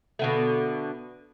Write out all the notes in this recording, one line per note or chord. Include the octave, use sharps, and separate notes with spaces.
B2 D3 A3